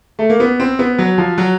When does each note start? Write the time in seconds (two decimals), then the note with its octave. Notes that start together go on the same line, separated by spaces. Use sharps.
0.19 A3
0.30 A#3
0.40 B3
0.60 C4
0.79 B3
0.99 F#3
1.18 F3
1.38 F#3